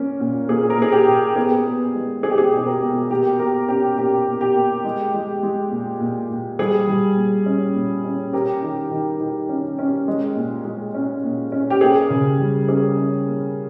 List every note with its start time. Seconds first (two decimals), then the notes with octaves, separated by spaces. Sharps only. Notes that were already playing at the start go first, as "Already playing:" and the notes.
Already playing: A#3 C#4
0.20 A#2
0.49 A#2 G#4
0.70 A#4
0.78 A#2 G#4
0.92 G4
1.08 A#2
1.36 B3 G#4
1.65 B3
1.95 G#3
2.23 G#3 G#4
2.30 G4
2.38 G#4
2.53 B2 G#4
2.66 G4 A#4
2.81 B2
3.11 A#2 G4 A#4
3.39 A#3 G4 A#4
3.68 C#4 G4
3.98 A#2 G4
4.27 A#3
4.41 G4
4.56 A#3
4.85 G#3
5.14 G#3
5.43 G#3
5.72 A#2
6.00 A#2
6.30 A#2
6.59 G3 G#4
6.87 G3
7.17 A#2
7.46 C#4
7.75 A#2
8.04 C#4
8.33 C#4 G4 A#4
8.62 D#3
8.91 D#3
9.20 D#3
9.49 C#4
9.79 C#4
10.08 G#3
10.36 A#2
10.65 G#3
10.94 C#4
11.24 A#2
11.52 C#4
11.70 G4
11.81 A#3 G#4
12.10 C#3
12.39 G3
12.68 C#4 G#4
12.98 C#4
13.27 A#3